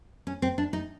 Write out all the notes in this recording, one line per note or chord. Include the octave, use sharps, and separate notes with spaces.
C#4
C4
D4
D#4